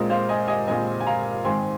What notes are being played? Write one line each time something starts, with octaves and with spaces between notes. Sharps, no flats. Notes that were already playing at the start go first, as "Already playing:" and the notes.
Already playing: A#2 G#3 C4 A#4 D#5
C5 F5
D#5 G#5
D#5 G#5
A#2 G#3 C4 D#5 G#5
G#5
F5 A#5
G#2 D#3 C4 G#5 C6